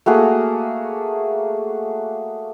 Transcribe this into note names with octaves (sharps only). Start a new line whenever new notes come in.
A3 A#3 F#4 G#4